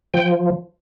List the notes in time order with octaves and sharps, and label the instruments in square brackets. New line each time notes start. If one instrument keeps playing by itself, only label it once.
[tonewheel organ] F3 G5